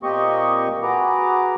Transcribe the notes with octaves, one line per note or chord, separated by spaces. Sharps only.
A#2 A#3 C4 G4 D#5 C#6
F#4 G#4 B4 A#5 D6